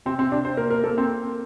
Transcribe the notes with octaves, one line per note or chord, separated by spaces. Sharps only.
C3 C4
C4
C3 D4
C5
A#3 A#4
A#4
A#3 A4
C4